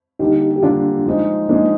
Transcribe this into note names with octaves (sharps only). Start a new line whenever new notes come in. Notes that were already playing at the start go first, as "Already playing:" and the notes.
D3 G3 A#3 D#4 G4
G4
D3 G3 A#3 D4 F4
F3 G#3 D#4
F3 G#3 A#3 D4 D#4